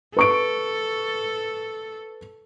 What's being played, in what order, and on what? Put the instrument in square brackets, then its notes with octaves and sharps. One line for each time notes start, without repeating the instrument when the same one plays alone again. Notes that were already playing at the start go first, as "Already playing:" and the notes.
[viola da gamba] A4 [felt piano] B4 C#6 D7